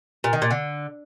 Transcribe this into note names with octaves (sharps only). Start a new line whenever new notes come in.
A#2
D#3
A#2
D3